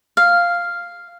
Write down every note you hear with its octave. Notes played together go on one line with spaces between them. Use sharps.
F5